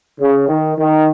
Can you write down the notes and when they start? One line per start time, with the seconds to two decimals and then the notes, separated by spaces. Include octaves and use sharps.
0.20 C#3
0.48 D#3
0.77 D#3